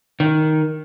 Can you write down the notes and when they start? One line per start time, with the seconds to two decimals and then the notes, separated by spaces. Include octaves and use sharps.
0.20 D#3